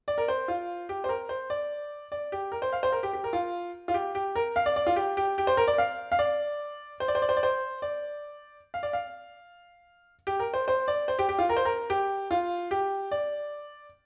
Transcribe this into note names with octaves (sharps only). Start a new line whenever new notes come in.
D5
A#4
C5
F4
G4
C5
A#4
C5
D5
D5
G4
A#4
C5
F5
C5
A#4
G4
G4
A#4
F4
F4
G4
G4
A#4
F5
D5
D5
F4
G4
G4
G4
C5
A#4
D5
F5
F5
D5
C5
D5
C5
D5
C5
D5
C5
D5
F5
D5
F5
G4
A#4
C5
C5
D5
C5
G4
G4
F4
A#4
C5
A#4
G4
F4
G4
D5